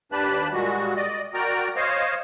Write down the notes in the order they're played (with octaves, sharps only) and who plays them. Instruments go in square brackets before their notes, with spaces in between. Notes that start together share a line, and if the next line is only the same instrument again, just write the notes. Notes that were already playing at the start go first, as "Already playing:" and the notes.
[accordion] D#2 D4 G4 B4 A5 F#6
A#2 G3 G#3 F#4
D5 D#5
F#4 A#4 D5 G5 A#5
C5 C#5 D#5 F5